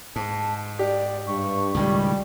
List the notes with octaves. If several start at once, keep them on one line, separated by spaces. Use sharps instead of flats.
G#2 A5
G4 D5
G2 C#6
C#2 A2 D#3 G3